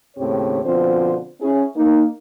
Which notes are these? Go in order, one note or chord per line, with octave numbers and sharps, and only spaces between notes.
D#2 A2 C#3 C4 G4 C#5
B2 D3 F3 C4 F4 C5
C#4 E4 G#4
A#3 D#4